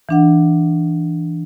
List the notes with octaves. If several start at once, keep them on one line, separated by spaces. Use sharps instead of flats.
E3 D4 F#5